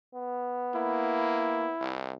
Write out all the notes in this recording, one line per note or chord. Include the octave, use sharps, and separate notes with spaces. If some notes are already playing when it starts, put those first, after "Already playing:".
B3
A#3 E4
C2